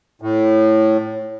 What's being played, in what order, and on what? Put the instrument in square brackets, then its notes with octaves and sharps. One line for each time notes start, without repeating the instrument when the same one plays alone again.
[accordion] A2